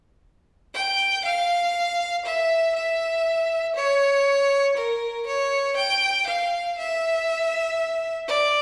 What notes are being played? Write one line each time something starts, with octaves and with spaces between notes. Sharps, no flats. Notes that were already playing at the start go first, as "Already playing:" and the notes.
G5
F5
E5
E5
C#5
A#4
C#5
G5
F5
E5
D5